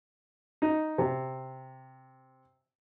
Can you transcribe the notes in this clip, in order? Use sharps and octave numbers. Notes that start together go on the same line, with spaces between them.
D#4
C3